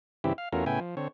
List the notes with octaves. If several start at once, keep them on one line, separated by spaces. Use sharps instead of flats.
G2 C#3 E3 C4 E4 G4
F5
E2 A3 C#4 F4 F#4 A#4
A2 C#3 B3 E4 G5 G#5
F3
D3 C4 C#5